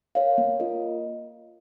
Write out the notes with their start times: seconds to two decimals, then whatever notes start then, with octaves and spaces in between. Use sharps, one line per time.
0.15 A#4 C#5 F5
0.38 A#3
0.60 F4 A#4 D#5